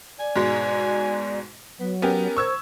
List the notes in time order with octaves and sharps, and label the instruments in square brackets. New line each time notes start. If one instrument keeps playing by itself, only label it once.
[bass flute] D5 [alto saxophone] G#5
[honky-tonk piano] G#2 B2 G#3
[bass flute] F#3 [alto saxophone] B3
[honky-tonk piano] B3 C#4 G4 [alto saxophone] A#4
[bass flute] C5 [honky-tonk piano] C#6 E6 G#6